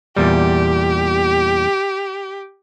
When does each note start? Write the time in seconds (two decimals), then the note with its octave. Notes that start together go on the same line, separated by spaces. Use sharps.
0.17 E2 A#2 G3 G4